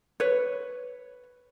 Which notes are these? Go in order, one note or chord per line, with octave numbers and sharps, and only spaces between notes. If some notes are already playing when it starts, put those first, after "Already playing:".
B4 C#5